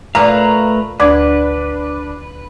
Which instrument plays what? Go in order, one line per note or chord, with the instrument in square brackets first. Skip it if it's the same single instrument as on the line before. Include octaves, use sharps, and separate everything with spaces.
[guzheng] A#2 [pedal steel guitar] A3 B4 F5 [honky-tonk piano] A#5
[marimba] D2 D6 G#6 [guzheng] D3 [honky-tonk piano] D4 [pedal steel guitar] B4